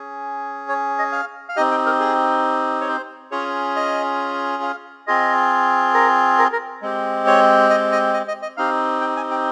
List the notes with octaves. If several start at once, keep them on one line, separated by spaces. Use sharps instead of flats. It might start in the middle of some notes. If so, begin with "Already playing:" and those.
Already playing: C#4 G#4
C#5
D#5
F5
F5
C4 D#4 G4 D#5
G5
A#4
G#4
C#5
C5
C#4 F4 G#4 C#5
D#5
F5
C4 F4 G#4 D#5
A#4
A#4
A#4
G#3 C4 G4
C#5
D#5
D#5
D#5
D#5
D#5
C4 D#4 G4 F5
G5
G#5
G5